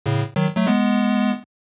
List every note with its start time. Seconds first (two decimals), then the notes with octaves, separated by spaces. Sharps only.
0.06 A2 C#3
0.36 D#3 F#3
0.57 F#3 A3
0.67 G#3 B3